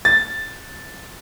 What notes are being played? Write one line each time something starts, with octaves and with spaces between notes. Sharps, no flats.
A6